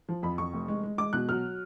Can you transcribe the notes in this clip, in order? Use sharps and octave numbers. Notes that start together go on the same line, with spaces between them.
F3
F2 B5
F2 C#6
F1
G#3
G#3
G#3 D6
B2 F#6
F#3 F6